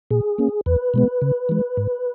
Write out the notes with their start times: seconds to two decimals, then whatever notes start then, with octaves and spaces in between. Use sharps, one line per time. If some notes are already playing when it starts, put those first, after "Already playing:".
0.11 A#2 G#4
0.38 A#3 C#4
0.66 E2 B4
0.94 B2 G#3 B3
1.22 C#3
1.49 E3 G#3
1.77 G#2